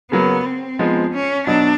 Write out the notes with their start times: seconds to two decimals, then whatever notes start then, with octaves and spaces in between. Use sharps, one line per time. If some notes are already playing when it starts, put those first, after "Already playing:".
0.11 C#3 F#3 A#3 B3
0.45 C4
0.79 F3 G#3 B3 D#4
1.13 C#4
1.47 B2 F#3 B3 D4 D#4